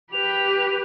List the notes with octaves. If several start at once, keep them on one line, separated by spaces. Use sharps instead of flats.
G4 B4 F7